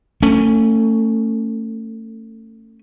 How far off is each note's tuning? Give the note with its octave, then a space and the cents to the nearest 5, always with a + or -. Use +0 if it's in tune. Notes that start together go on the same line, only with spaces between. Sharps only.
A3 +30 C#4 +0